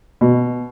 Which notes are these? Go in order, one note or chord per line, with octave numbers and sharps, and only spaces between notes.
B2